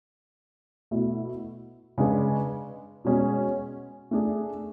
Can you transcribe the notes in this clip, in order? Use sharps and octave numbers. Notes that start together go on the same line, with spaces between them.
B2 A3 E4
C#3 G#3 D4 G#4 B4
B2 G#3 C#4 G#4
A3 D4 G#4